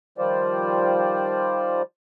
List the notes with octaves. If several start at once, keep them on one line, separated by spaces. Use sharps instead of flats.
D#3 F3 G3 F4 C5 D5